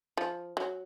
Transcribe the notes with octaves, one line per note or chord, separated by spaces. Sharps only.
F3
F#3